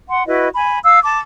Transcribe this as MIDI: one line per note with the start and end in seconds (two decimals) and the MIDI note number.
0.09 0.25 78
0.09 0.25 84
0.26 0.48 64
0.26 0.48 66
0.26 0.48 71
0.26 0.48 75
0.54 0.79 80
0.54 0.79 83
0.83 0.99 77
0.83 0.99 88
1.03 1.19 81
1.03 1.19 86